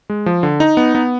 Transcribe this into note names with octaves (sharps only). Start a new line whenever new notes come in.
G#3
F3
D3
D#4
B3
B3